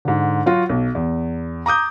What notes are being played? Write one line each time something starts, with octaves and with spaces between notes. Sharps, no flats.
G#2 D3
F#3 F4 F#4
B1
E2
A#5 D6 D#6 G6